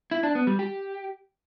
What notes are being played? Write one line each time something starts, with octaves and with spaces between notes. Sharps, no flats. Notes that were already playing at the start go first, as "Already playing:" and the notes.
E4
D4
B3
G3
G4